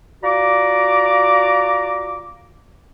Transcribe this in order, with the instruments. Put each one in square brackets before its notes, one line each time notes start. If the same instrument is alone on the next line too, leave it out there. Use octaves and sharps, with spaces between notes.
[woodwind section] F4 F#4 D5 A#5 D6